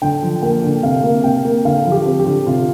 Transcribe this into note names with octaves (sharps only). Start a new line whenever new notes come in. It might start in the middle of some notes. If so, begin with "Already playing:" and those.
D3 G5
F3
A#3 G5
D3
C3 F5
A#3
C3 G5
A#3
D3 F5
F3
G4
C4
G4
D3
C3 F4